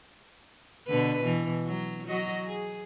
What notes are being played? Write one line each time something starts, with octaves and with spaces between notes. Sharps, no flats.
B2 D3 B4
B2 E3
F#3
F#3 F#4 D#5
G#4